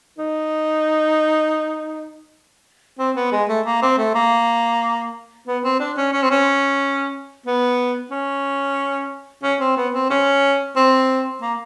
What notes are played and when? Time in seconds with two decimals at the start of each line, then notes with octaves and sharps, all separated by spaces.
0.18 D#4
2.99 C4
3.16 B3
3.32 G#3
3.49 A3
3.66 A#3
3.82 C4
3.98 A3
4.15 A#3
5.47 B3
5.64 C4
5.80 D4
5.97 C#4
6.13 C#4
6.22 C4
6.31 C#4
7.46 B3
8.11 C#4
9.43 C#4
9.60 C4
9.77 B3
9.94 C4
10.10 C#4
10.76 C4
11.42 A#3